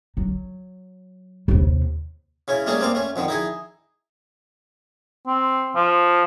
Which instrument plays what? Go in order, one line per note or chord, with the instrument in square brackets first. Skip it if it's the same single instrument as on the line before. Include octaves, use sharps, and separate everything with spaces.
[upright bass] F#3
D#2 C3
[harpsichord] C#3 C#4 E4
G3 A3 A#3 C#4 D4 G#4
A3 A#3 C4 D5 F5
A3 C#4
F2 D3 D#3 F3
D#4 E4 G#4
[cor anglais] C4
F3